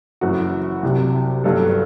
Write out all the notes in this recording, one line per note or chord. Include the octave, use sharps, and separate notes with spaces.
F#1 F#2 E3 F#4
C2 C3 F#3
G1 G2 D3 F#3 A4